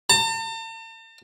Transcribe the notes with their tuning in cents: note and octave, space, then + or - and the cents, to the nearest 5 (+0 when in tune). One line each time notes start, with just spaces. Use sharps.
A5 +45